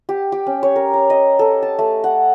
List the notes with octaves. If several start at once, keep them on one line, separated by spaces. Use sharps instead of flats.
G4
G4
C#4
C#5
A#4
A#5
D#5
A4
A5
A3
F#5